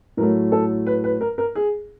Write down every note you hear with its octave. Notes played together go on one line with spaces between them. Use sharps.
A2 F#3 A3 A#4
A4
B4
B4
A#4
A#4
G#4